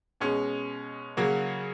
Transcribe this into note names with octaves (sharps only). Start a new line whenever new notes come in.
B2 G#3 C#4
C#3 F#3 A#3